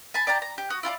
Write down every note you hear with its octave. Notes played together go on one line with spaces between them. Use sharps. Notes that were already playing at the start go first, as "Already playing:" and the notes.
G#5 A5 B5
D5 G5 A5 A#5
A#5
G4
F#4 D#6
E4 F4 A4 D5